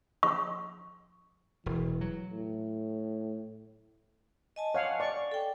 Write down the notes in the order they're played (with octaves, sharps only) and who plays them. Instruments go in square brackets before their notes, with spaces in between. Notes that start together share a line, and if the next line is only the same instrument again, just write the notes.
[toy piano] C#6
[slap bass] E1 [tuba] E3
[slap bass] F#3
[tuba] A2
[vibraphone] D#5 G#5 A5
[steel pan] C#5 F5 F#5
D5 C#6
[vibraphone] A4 G5